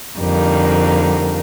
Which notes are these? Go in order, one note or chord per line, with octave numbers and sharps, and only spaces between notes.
F2 D3 G3 A#3 D#4